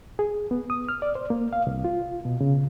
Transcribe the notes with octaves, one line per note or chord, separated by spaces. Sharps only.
G#4
B3
D#6
F6
D5
C5
A#3
F5
C2
F4
B2
C#3